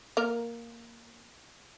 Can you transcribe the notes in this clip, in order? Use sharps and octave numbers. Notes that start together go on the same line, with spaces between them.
A#3 A#4